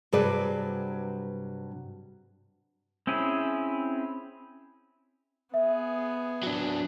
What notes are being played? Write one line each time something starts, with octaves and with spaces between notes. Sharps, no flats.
G2 C3 F#3 G#4 B4 D5
C4 C#4 E4 G#4
B3 G#4 E5
F#3 D4